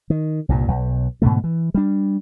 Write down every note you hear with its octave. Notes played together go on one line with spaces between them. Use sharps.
D#3
C2 G2 A#2
B1
G#2 B2 D3 A3
E3
G3 D4